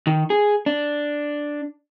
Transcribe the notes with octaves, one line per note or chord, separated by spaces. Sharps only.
D#3
G#4
D4